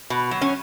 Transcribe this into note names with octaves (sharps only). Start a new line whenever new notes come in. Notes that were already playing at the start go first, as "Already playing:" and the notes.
B2
F#3
C#4